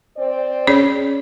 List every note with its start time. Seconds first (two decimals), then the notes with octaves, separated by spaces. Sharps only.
0.17 C4 C5 D5
0.67 C#4 G#4 C#5